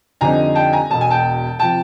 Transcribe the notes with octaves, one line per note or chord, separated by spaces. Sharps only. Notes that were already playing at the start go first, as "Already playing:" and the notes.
F2 D3 G3 C4 D#4 G#5 A#5
G5 A5
G#5 A#5
E1 E2 B2 A5
G#5
G5 A5
C3 F3 G5 A5